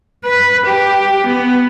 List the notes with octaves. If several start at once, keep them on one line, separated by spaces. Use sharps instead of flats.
B4
G4
B3